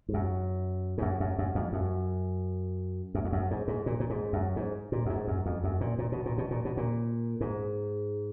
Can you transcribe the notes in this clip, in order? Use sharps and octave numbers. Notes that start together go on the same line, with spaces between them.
G#2
F#2
G#2
F#2
F#2
F#2
F2
F#2
F#2
F2
F#2
G#2
G#2
A#2
A#2
G#2
F#2
G#2
A#2
F#2
G#2
F#2
F2
F#2
A#2
A#2
B2
A#2
B2
A#2
B2
A#2
G#2